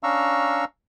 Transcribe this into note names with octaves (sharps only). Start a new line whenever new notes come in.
C#4 D4 F5 A#5 C#6 E6